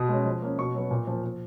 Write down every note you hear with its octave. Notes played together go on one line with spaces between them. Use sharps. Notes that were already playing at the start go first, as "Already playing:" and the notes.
Already playing: B2 D#6
G#3 C#4
F3
A#3 C#4
B2 C#6
F#3 B3
A#2
F3 A#3
F3